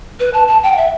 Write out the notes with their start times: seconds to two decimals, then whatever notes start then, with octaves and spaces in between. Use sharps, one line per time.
0.20 B4
0.34 A5
0.48 A5
0.63 G5
0.72 F#5
0.77 E5